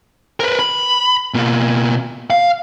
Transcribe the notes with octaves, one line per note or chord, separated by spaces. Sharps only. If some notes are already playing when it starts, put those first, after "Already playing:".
A#4 B4
B5
B2 A#3
F5